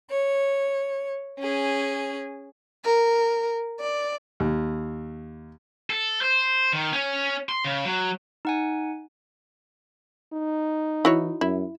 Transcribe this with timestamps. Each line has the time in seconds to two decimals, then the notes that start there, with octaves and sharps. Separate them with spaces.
0.11 C#5
1.39 C#4 G#4
2.84 A#4
3.80 D5
4.40 D#2
5.90 A4
6.21 C5
6.73 D#3
6.93 C#4
7.49 C6
7.64 C#3
7.85 F#3
8.45 D#4 F#5 G#5
10.33 D#4
11.05 E3 E4 F#4 C#5
11.41 F#2 E4